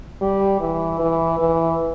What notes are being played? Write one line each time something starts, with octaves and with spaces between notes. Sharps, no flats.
G3
E3
E3
E3